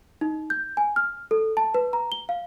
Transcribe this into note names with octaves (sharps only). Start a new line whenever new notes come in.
D#4
G6
G#5
F6
A4
A5
B4
A#5
G7
F5